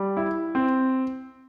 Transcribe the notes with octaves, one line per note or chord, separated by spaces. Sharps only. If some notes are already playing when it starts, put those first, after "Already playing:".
Already playing: G3
E4
C4